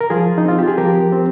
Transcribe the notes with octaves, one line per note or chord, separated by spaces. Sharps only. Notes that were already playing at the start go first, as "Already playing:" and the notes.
A#4
F3 F4 G#4
D#4
C4 F4
G4
G#4
F3 G4 A#4
C4